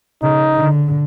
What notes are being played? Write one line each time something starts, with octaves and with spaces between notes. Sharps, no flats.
C#3 D#4
D3